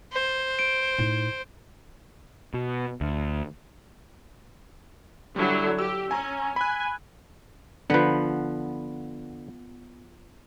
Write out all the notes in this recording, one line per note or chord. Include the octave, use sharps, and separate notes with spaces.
C5
D7
A2 D#4
B2
D2
D3 F#3 G3 E4
G4 E6
C#4 G#5 A#5
G#5 B5 F#6
D3 F3 B3 B4